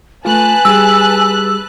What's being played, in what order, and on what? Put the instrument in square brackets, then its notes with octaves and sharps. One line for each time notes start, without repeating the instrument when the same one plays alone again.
[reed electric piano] A3 F4 [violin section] B4 A5 F#6 [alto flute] G#5
[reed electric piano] G3 G4 G#4 [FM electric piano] E6